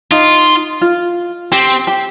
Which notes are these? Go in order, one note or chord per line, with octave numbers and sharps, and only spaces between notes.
D#4 F4
F4
C4 G4
G4